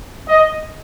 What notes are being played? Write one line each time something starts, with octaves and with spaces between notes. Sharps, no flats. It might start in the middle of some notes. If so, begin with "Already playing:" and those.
D#5